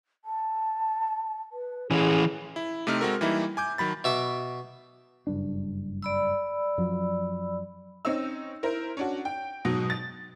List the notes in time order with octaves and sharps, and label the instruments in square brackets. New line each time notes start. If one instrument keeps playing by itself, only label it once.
[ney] A5
B4
[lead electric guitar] E3 C#4 [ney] G#4
[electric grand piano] E4
C3 A3 C4 D#4 F6
G#3 C4 F#4 A4 A#4
E3 G3 A#3 D#4 E4
G#5 D6 G6
D#3 F#3 B5 A6
[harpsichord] B2 E5 D6
[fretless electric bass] F#1 G2 D4
[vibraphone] D5 B5 E6
[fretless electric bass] F#2 F3 F#3
[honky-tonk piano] C4 C#4 D#4 E6
E4 A#4 C5
C#4 D4 F#4
G5
G#2 B2 F#3
A6